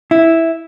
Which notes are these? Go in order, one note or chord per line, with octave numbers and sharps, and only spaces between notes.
E4